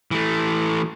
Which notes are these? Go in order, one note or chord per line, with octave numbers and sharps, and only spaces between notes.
E3 A3